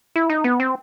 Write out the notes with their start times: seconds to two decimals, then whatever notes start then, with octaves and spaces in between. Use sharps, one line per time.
0.16 E4
0.30 D#4
0.44 B3
0.60 C4